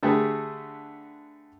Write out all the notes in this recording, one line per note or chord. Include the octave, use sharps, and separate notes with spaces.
D3 A3 G4 G#4 B4